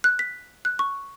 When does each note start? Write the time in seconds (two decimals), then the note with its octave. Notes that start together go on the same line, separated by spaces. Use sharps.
0.04 F#6
0.19 B6
0.65 F#6
0.79 C#6